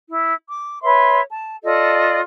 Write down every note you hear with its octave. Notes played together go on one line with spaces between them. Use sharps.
E4
D6
B4 C#5 E5 C6
A5
F4 A4 D5 D#5